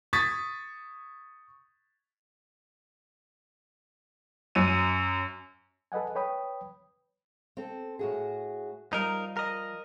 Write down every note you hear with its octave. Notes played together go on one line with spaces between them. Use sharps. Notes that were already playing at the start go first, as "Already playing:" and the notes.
C#6 D#6 G#6 A6 B6
F#2 D#7
A4 B4 D#5 F#5 G#5
B4 C#5 G5 B5 D#6
C4 A4
A2 F#4 G#4
F3 G3 D#4 A#4
A#4 D#5